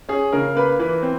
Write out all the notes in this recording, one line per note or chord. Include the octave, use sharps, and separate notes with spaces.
C#4 G#4
C#3 A#4
A#3 B4
E3 B4
C4